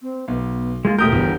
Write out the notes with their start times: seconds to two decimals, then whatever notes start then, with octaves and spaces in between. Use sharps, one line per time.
0.01 C4
0.28 B1 B3
0.85 G#3 A#3 F4
0.99 E1 A3 G4 A#4 D#6 G6
1.12 G1 E2 B3